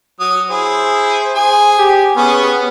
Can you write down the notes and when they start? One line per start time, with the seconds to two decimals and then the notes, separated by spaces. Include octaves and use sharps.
0.20 F#3 D#6
0.51 E4 G#4 C5
1.35 G#4 G#5
1.78 G4
2.16 B3 C#4 G#4